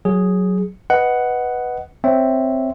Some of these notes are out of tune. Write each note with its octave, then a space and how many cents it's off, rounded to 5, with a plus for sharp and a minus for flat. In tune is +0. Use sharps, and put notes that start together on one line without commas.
F#3 +0 G#4 +0
B4 +0 D#5 +0 F#5 +5
C4 +0 C#5 +0 E5 +0